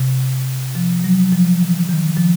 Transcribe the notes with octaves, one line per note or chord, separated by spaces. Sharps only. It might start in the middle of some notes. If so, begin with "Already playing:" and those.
Already playing: C3
F3
F#3
F3
E3
D#3
F3